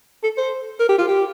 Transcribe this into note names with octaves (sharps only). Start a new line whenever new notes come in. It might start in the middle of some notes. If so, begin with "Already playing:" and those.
A4
C5
A#4
G4
F4
G4